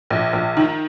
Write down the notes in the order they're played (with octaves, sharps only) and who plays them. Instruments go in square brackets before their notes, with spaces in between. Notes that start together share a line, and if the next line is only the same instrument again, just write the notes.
[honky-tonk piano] A#1
A#1
D#3